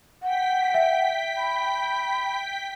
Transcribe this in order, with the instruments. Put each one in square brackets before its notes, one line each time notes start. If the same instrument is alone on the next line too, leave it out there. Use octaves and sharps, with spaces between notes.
[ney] F#5 [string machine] G5 B6
[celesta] E5
[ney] B5